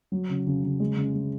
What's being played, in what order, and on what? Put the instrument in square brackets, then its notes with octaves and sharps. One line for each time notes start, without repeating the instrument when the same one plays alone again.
[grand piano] F#3
C#3
C#3
C#3
G#3
C#3
G#3